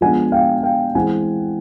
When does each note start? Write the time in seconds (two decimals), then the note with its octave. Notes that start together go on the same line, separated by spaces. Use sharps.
0.01 F3 G#3 B3 D4 F#5 G#5
0.32 F5 G5
0.63 F5 G5
0.95 E3 G#3 C4 F#5 G#5